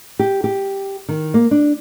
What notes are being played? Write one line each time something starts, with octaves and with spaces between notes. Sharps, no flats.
G4
G4
D#3
A#3
D4